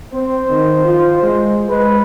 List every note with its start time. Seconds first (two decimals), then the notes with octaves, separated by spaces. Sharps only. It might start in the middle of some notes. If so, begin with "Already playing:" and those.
0.13 C4 C5
0.50 D#3
0.85 F4
1.23 G#3
1.69 G#3 B4